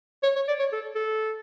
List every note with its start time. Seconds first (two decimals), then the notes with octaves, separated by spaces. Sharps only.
0.23 C#5
0.36 C#5
0.48 D5
0.59 C#5
0.72 A4
0.95 A4